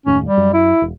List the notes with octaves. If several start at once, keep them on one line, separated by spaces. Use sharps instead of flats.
F#1 D#2 A2 C#4
G3
F#2
E4
E1